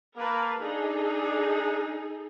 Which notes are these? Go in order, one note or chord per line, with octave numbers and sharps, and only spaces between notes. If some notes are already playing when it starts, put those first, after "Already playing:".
A#3 A#4 B4 A5
D4 D#4 G#4 A4